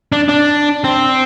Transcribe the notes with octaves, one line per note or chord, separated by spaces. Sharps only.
D4
D4
C4